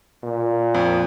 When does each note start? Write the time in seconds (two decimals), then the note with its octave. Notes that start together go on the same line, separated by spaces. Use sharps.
0.23 A#2
0.75 F2